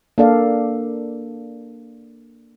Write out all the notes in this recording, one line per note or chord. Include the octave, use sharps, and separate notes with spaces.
A#3 D4 A4 D5 F5